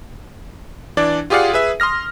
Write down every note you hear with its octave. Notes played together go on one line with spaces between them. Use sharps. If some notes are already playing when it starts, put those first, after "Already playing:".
E3 D4 D5
F4 G4 G#4 D5 F5 F#5
G#4 B4 E5
C6 D#6 F6 A#6